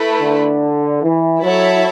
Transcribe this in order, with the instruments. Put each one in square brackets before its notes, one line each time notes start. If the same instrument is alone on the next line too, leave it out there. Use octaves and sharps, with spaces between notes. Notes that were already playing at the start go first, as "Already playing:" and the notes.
Already playing: [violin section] A3 E4 B4
[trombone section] D3
E3
[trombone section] F#3 [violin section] E4 A4 C#5 E5 A5